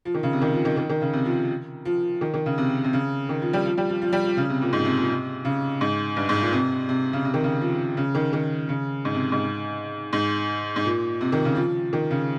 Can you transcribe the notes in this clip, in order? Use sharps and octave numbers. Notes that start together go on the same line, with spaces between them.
F3
D#3
C#3
C3
D#3
F3
D#3
D#3
D#3
C#3
C3
F3
F3
D#3
D#3
C#3
C3
C3
C#3
D#3
F3
G3
F3
G3
F3
F3
G3
F3
C#3
C3
A#2
G#2
C3
A#2
C3
C#3
G#2
G2
G#2
A#2
C3
C3
C#3
C3
D#3
C#3
F3
C#3
D#3
D#3
C#3
G#2
C3
G#2
G#2
G#2
A#2
C3
D#3
C#3
F3
D#3
C#3